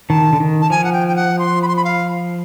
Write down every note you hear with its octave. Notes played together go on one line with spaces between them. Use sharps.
D#3 A5
D3
D#3
A5
F3 G#5
F#5
G5
G5
F#5
C6
B5
C6
B5
F5